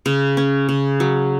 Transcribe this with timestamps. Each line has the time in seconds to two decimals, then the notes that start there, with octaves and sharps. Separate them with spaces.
0.06 C#3
0.37 C#4
0.69 C#3
1.00 F#3